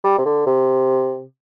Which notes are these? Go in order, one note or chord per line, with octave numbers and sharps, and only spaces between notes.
G3
C3
D3
C3